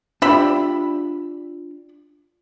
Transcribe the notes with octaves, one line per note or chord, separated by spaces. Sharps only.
D4 F4 G4 D5 E5 B5